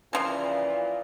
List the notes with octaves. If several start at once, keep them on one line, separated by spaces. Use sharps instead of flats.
A#2 C#3 E3 F3